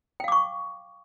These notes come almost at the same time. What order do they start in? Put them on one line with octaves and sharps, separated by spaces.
G5 F5 D6 C#6